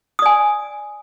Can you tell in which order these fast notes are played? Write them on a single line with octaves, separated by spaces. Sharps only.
D#6 D5 G#5